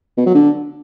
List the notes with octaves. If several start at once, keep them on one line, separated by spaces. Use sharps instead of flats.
B2
F#3
D3